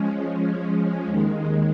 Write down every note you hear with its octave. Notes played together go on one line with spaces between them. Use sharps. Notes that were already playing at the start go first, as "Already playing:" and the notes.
Already playing: F3 G#3 C#4
D#2 D#3 G#3